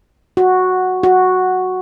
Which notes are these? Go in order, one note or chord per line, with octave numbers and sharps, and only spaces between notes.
F#4
F#4